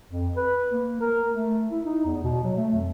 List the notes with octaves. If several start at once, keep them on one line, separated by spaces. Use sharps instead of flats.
F2
B4
A#3
A#4
A3
E4
D#4
E2
B2
F#3
A3
F2